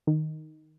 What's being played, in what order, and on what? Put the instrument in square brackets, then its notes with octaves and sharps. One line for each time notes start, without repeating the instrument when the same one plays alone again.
[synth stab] D#3